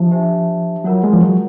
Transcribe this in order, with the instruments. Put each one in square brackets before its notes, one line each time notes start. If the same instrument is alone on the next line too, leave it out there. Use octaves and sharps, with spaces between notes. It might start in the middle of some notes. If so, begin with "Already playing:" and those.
Already playing: [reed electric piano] F3 [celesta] D4 G4 C5 E5 A5
[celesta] D4 G4 C5 E5 A5
[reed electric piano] F#3 [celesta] F4 A#4 C#5 F#5
[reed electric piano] G#3
F3
F#3